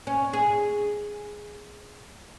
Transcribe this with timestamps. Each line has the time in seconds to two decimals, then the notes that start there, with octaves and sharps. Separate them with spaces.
0.07 C#4
0.33 G#4